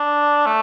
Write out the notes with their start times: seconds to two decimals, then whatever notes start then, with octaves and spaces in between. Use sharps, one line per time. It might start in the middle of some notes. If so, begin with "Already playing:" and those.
Already playing: D4
0.46 A3